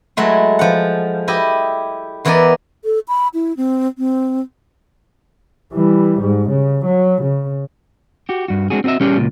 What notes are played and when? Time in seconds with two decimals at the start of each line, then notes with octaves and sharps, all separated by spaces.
0.17 F#3 G#3 A3 E4
0.59 F3 F#5
1.28 E4 G4 D#5
2.25 E2 E3 B3 A#4 D5 D#5
2.85 A4
3.08 B5
3.34 E4
3.57 C4
3.98 C4
5.73 E3 G3
6.20 G#2
6.49 C#3
6.86 F#3
7.22 C#3
8.29 F#4 G4
8.48 G2 F#4
8.70 G#3 C4 D4 F#4 G#4
8.84 C4 F#4 G#4 D#5 E5
9.00 G3 C#4 G4 G#4 D5
9.17 C#2 G2 A#2